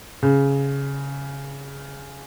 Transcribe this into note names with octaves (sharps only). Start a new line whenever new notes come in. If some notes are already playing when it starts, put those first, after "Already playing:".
C#3